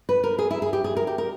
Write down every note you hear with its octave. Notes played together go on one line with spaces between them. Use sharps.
B4
A#4
G#4
E4
G#4
G4
G#4
A#4
G4
A#4